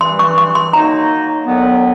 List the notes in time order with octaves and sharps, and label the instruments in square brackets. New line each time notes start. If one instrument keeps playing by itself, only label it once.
[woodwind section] G2 E3 G3 [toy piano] C6
[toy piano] C#6
C#6
C6
[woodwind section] D#3 F#3 A#3 D#4 [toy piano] A#5
[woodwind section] D#2 D3 F#3 B3